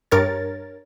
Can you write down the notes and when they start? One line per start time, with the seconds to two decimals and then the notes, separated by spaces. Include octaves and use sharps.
0.11 G2 A#4 C#5 A6